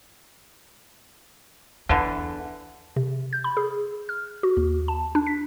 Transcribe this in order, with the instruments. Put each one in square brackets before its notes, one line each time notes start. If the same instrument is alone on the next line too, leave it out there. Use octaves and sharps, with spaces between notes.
[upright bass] E2 [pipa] D3 E3
[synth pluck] C3
G6
B5
G#4
F6
F#4
D#2
A5
D4
B6